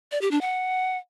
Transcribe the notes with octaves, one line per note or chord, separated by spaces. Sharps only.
D5
G4
D4
F#5